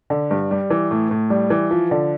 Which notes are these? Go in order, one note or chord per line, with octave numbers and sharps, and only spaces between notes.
D3
G2
G3
E3
A2
A2
G3
E3
F3
D3